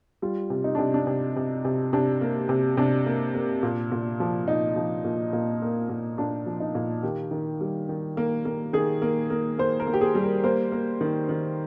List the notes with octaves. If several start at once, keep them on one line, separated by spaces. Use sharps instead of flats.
G3 F4
C3
D#4
C3 D4
D4
C3
C3
C3
C3 D4
A#3
C3
C3 D4
A#3
A#3
A#2
A#2
F3
A#2 D#4
F3
A#2
A#2
A#3
A#2
A#2 D4
F3
D#4
A#2
D#3 G4
D#3
G3
D#3
A#3
A#3
D#3 G#4
A#3
A#3
A#3 C5
A#4
A#3
G4
G#4
G3
A#4
A#3 C5
A#3
D#3
D#3